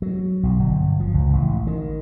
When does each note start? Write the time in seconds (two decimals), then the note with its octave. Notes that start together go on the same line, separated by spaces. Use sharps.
0.02 F#3
0.43 B1
0.59 G1
1.00 F3
1.14 C#2
1.33 A1
1.67 D#3